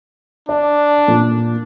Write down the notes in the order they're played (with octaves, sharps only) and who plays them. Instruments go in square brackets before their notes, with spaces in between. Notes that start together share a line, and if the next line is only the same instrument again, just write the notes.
[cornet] D4 [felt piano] D5
[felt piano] A#2